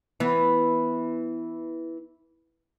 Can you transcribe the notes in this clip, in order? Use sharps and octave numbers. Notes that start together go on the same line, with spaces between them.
E3 B3